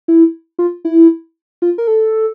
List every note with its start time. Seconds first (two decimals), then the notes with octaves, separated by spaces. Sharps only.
0.08 E4
0.59 F4
0.85 E4
1.62 F4
1.78 A#4
1.87 A4